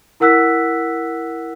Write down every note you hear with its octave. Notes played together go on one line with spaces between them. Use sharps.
E4 A#4 F#5 E6 F#6 B6